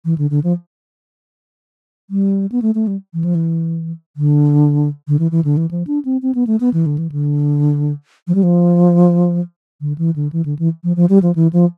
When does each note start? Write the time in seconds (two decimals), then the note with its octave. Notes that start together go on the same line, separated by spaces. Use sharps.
0.05 E3
0.18 D3
0.30 D3
0.44 F3
2.10 G3
2.52 B3
2.62 A3
2.75 A3
2.87 G3
3.14 E3
3.24 F3
3.35 E3
4.17 D3
5.08 D3
5.19 E3
5.31 E3
5.45 D3
5.57 E3
5.71 F3
5.87 D4
6.05 C4
6.22 C4
6.35 B3
6.47 A3
6.60 B3
6.74 E3
6.86 D3
6.98 E3
7.12 D3
8.28 F3
8.35 G3
8.43 F3
9.81 D3
9.98 E3
10.16 D3
10.33 E3
10.45 D3
10.59 E3
10.84 F3
10.96 F3
11.09 G3
11.23 F3
11.36 E3
11.53 F3